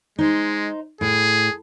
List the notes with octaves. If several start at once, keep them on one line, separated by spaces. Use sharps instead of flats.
G#3 D#4 C5
A2 G#4